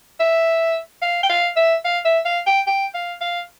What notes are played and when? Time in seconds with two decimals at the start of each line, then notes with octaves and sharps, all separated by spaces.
0.20 E5
1.02 F5
1.23 G5
1.29 F5
1.56 E5
1.85 F5
2.05 E5
2.25 F5
2.47 G5
2.67 G5
2.94 F5
3.21 F5